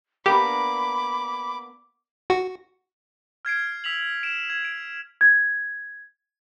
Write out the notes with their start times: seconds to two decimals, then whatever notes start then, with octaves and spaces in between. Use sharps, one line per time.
0.26 A#3 B3 D4 G4 B5 D6
2.30 F#4
3.45 F6 G#6 C7 D7
3.84 E6 B6 F7 F#7
4.23 D7 E7
4.50 G#6
4.65 D7
5.21 G#6